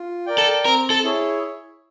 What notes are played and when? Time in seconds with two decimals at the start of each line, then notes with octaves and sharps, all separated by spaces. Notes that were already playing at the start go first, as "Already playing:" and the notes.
Already playing: F4
0.26 A#4 D5 G5
0.38 A4
0.65 C4 A#4
0.90 A4
1.04 E4 G#4 C#5